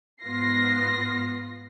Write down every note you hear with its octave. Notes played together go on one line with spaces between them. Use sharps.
G#2 B3 F4 A#6 C7